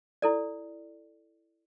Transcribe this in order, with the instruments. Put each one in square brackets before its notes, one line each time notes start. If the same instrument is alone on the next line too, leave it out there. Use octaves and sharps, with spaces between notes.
[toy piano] E4 A4 D5